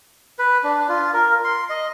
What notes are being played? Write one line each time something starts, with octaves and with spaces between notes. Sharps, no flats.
B4
D4
F4
A#4
C6
D#5